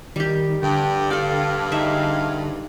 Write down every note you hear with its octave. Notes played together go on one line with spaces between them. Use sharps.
D#3 G3 G4
G2 D3 G5
A4 D5 F5
D#4 G#4 E5